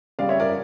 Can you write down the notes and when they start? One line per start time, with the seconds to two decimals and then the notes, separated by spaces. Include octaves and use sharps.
0.19 C#3 G3 D5 F5
0.29 C#5 E5
0.40 A#4 D5